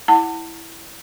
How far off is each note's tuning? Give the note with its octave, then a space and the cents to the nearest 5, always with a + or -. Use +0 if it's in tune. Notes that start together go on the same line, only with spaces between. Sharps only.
E4 +0 F#5 +0 A5 +35